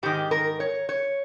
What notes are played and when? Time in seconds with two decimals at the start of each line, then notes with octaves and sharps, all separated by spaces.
0.03 G#2 D#3 G4
0.31 A#4
0.60 C#5
0.89 C#5